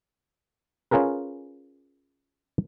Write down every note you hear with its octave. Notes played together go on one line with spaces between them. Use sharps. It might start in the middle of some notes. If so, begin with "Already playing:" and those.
C#4 F4 G#4 A#4 B4